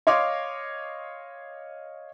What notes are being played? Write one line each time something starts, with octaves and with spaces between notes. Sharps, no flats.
C#5 D#5 F5 C6 D6